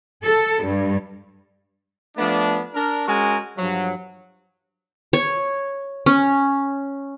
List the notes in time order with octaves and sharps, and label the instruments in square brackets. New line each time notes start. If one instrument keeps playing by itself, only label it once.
[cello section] A4
G2
[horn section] F3 A3 B3 D4
D4 A#4
G#3 C#4 F#4 A#4 G#5
G2 F3 F#3
[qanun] C#5
C#4